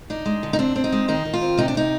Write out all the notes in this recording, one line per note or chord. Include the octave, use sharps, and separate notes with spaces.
D4 D#4
G#3
D3
D#4
C4 D4
C4
D#4
G#3
D#3 D#4
D#3
F4
C4
C3 D#4
D4
C3 D#4